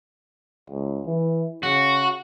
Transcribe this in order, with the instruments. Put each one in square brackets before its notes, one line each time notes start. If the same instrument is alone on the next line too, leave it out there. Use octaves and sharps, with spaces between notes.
[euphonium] C#2
E3
[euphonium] C#3 [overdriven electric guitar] F#4